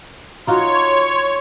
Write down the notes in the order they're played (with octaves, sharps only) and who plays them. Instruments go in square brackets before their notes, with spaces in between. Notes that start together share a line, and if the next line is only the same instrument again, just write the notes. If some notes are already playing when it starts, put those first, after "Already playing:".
[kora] D#4 F4 F#4 [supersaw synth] C#5 [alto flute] C6